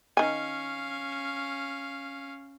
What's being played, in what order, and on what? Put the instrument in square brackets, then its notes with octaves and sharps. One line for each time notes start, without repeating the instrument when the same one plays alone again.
[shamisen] D#3 G#5 [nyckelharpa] C#4 F5